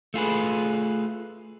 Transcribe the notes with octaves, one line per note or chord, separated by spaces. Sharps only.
A3 F4 G#4 B4